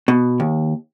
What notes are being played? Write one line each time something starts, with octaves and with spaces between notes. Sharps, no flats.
B2
D#2